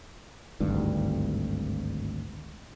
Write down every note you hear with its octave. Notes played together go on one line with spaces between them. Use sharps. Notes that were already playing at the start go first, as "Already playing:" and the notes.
G#1 D2 G2